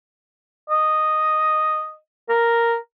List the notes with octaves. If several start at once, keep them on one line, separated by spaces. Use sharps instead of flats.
D#5
A#4